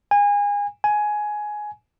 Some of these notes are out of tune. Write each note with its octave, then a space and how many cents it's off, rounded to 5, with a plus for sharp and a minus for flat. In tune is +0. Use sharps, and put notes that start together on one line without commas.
G#5 -25
G#5 +15